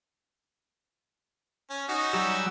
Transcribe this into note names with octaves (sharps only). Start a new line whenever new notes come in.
C#4
C#4 D#4 F#4
F#3 G3 E6